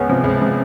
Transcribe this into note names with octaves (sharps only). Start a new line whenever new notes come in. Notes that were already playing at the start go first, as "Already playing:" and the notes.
Already playing: C#2 B3 C#4
C3 F3
C#2
C3 F3